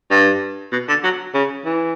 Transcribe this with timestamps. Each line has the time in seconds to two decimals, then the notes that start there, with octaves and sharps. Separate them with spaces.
0.11 G2
0.72 B2
0.88 D3
1.04 F#3
1.34 C#3
1.65 E3